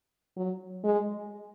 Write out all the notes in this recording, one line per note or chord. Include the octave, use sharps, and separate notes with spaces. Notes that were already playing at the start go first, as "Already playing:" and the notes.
F#3
G#3